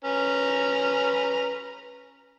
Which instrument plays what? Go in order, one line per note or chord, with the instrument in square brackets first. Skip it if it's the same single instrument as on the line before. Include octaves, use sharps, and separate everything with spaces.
[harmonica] C#4 B4 A#5